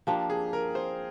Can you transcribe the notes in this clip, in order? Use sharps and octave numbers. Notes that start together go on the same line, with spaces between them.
F3 A#3 D4 G4
G#4
A#4
C5